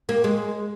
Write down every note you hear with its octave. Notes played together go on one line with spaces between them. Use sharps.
A#3
G#3